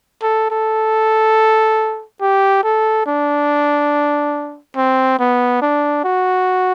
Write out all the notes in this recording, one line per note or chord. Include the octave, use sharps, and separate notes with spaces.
A4
A4
G4
A4
D4
C4
B3
D4
F#4